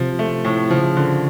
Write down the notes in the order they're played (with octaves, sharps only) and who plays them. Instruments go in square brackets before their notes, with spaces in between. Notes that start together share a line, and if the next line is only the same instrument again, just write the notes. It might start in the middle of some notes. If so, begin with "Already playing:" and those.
Already playing: [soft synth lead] C3 [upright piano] F3
[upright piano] A3
A2
[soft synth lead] C#3 [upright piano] F3
[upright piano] D3